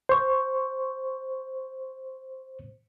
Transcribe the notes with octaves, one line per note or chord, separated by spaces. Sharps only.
C5 C#6